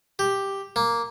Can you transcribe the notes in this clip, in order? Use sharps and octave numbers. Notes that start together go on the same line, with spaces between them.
G4
A#3